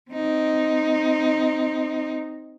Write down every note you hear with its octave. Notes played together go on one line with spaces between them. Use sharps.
C4 D#4